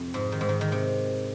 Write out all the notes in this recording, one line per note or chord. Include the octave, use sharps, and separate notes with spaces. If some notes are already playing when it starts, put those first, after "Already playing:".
Already playing: F2 C3
G#2
D#3
G#2
D#3
D#3
C3